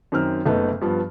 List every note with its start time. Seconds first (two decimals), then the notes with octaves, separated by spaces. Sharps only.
0.12 F#2 D#3 C4 F6
0.46 F#1 A3 B3 D#4
0.81 G2 F3 B3